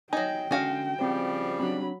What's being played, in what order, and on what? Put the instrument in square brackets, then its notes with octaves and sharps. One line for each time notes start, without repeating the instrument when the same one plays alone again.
[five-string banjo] F#3 D#4 [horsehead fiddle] G5 [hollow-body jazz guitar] G#5
[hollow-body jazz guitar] D3 C#4 [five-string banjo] G#3 F#4 F5
[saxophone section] C#3 F3 G3 [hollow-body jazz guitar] C4 C5
[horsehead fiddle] F#3 B5 [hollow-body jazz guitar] C4 D4